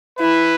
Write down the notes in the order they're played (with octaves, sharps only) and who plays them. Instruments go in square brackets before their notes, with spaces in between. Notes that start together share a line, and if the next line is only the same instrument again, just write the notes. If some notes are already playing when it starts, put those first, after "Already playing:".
[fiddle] E4 [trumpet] B4